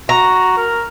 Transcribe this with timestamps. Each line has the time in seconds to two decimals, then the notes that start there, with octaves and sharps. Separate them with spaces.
0.09 F#4 A#5
0.58 A#4